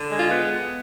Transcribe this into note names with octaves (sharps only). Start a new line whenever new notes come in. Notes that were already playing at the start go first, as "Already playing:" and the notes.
Already playing: D3
G#3
F4
B3